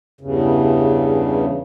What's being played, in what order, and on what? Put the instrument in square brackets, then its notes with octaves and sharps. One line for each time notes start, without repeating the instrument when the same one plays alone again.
[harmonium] E2 G2 C#3